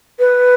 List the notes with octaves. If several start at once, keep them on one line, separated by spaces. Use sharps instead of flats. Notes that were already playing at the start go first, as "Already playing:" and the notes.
B4